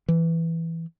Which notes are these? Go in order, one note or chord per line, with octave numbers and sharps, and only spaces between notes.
E3